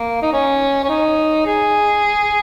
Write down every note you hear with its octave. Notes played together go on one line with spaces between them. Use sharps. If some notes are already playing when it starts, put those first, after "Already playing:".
Already playing: A#3
D#4
C#4
C#4
D#4
G#4